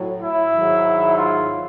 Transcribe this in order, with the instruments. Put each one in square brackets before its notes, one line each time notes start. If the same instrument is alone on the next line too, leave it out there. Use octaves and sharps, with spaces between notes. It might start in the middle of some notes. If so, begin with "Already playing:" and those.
Already playing: [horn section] A2 F#3
E4
G#2 D#3 F#3
F4